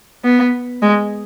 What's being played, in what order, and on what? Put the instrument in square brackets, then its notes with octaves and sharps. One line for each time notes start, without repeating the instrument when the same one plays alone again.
[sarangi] B3
G#3